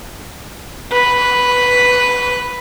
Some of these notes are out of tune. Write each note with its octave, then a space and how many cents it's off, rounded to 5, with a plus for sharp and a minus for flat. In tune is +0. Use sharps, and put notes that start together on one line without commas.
B4 +0